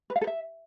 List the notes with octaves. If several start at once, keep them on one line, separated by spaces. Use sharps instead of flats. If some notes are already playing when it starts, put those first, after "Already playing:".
B4
F5
A4
E5